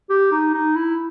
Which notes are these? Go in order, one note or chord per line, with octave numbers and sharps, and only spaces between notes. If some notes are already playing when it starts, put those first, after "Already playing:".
G4
D#4
D#4
E4